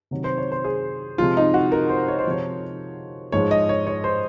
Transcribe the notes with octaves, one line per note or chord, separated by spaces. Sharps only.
C3 D#3 F#3
C5
C#5
C5
G#4
C3 F3 G#3 F4
D#4
F#4
A#4
C5
C#5
C5
C3 F3 G#3 C#5
G#2 F3 G#3 C#5
D#5
C#5
C#5
C5